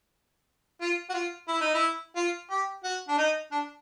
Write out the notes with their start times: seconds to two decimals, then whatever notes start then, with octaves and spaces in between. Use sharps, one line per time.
0.81 F4
1.10 F#4
1.14 F4
1.48 E4
1.61 D#4
1.74 E4
2.17 F4
2.51 G4
2.84 F#4
3.08 D4
3.18 D#4
3.52 D4